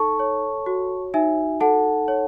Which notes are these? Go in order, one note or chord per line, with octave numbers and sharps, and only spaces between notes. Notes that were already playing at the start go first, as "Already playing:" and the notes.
Already playing: D#4 A4 A5 C#6
C#5
F#4
D#4 E5 G#5
A4 F#5 A5
C#5